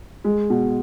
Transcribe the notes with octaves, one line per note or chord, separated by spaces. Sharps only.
G#3
B2